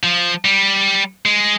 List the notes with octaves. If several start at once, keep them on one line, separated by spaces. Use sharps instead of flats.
F3
G3
G#3